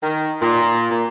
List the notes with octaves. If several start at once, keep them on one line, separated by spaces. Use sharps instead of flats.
D#3
A#2
A#2